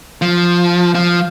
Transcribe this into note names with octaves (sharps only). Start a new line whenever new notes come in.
F3
F3